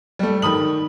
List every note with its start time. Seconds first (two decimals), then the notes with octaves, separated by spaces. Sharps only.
0.19 G3 A3
0.42 D#3 B5 D#6 F#7